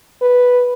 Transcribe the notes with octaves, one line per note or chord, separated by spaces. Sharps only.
B4